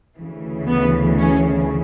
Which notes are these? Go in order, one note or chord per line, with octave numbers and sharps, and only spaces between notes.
D2 C#3 E3
B3
C#4